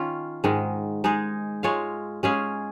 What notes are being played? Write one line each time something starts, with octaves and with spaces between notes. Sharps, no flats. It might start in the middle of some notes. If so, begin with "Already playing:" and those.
Already playing: D#3 C#4 F4
G#2 D#3 G#3
G#3 D#4 G#4
G#3 F4 C#5 F5
G#3 C#4 G#4 F5